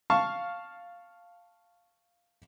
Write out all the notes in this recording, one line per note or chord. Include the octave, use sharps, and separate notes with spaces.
F5 A5 C#6